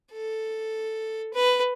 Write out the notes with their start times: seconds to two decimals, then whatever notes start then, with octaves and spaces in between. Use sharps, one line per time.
0.13 A4
1.34 B4